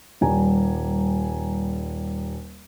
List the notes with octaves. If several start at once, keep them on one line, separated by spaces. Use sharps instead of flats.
D#1 G3 G#5 A#5